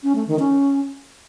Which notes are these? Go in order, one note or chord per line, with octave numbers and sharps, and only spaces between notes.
C#4
A3
D#3
C#4